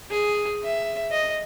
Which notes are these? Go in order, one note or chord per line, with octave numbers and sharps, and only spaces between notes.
G#4
E5
D#5